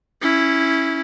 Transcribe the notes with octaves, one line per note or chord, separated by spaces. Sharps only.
C#4 E4